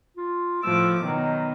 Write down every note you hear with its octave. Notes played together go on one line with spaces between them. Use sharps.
F4
A2 F3 D6 E6
B2 D#3 F#3